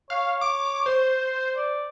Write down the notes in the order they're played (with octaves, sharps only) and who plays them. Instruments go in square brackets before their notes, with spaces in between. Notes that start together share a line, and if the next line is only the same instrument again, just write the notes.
[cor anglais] C#5 [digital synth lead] F5
[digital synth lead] D6
C5
[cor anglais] D5